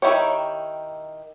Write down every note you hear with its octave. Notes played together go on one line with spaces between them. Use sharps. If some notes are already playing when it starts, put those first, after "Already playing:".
D#3 E4 G4 C#5